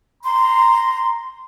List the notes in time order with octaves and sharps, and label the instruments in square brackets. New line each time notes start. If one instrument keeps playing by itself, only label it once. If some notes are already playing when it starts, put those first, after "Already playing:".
[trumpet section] A#5 [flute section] C6